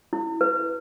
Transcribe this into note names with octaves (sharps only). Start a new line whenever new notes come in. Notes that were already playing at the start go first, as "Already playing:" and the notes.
E4
B4